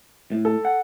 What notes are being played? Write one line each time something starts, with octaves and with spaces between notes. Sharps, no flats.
A2
A4
F#5